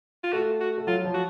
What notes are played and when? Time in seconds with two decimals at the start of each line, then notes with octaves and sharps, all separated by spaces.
0.23 F4
0.32 A3 F#4
0.60 F#4
0.78 A3
0.87 F#3 F4
1.05 F3
1.14 F#4